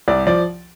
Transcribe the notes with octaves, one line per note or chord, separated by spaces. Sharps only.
C2 D5
F3 D5